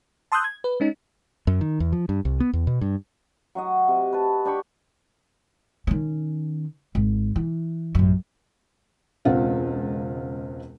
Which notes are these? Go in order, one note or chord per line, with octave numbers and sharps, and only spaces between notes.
A5 C6 D#6 E6 F#6 G6
G#6
B4
G#3 C#4 D#4
F#2
D#3
E2
F3
G2
C2
B3
E2
B2
G2
F#3 F#4 D#5
C3
B4 A5
D4 G4 B5 C#6
D#3 C#4
G#1
E3
A1 F#2
E1 C#2 C4 F4 F#5